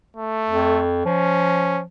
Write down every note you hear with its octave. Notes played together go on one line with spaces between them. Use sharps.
A3
F2
F3 C#4